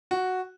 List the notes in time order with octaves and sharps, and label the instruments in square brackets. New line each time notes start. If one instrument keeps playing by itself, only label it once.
[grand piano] F#4